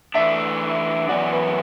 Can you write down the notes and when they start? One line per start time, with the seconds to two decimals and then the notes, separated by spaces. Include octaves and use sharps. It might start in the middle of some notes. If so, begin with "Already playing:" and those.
0.14 E3 A3 D4 E5
1.09 F#2 E3 B3 F#4 D5
1.32 B4